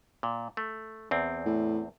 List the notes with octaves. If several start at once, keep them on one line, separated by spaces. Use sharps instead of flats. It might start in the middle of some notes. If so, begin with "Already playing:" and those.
A#2
A3
E2 C4
A2